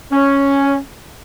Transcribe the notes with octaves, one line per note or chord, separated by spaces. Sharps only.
C#4